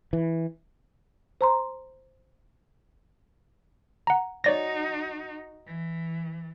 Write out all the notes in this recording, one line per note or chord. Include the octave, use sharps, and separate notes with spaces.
E3
C5 A#5 C6
F#5 A#5
D#4 F#4 C#5 D5 A#6
E3